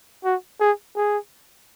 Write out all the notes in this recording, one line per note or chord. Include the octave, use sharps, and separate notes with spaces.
F#4
G#4
G#4